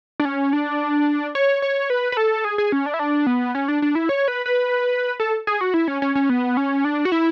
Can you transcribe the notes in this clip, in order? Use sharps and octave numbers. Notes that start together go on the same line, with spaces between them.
D4
C#4
D4
C#5
C#5
B4
B4
A4
G#4
G#4
C#4
D4
E4
D4
B3
C#4
D4
D4
E4
C#5
B4
B4
A4
G#4
F#4
E4
C#4
C#4
C#4
B3
C#4
D4
F#4
E4